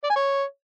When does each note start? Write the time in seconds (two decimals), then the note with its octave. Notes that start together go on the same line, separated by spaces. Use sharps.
0.04 D5
0.10 G#5
0.16 C#5